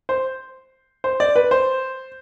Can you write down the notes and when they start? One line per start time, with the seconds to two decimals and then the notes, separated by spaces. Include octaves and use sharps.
0.09 C5
1.04 C5
1.20 D5
1.36 B4
1.51 C5